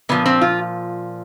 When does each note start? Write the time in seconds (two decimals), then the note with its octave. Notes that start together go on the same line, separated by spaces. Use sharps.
0.09 A#2 F3 B3
0.26 C4
0.41 F4